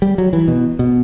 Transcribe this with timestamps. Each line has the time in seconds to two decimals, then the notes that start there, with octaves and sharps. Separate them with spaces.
0.02 G3
0.18 F#3
0.33 E3
0.48 B2
0.79 B2